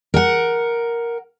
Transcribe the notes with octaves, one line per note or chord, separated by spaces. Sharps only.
A#4 F#5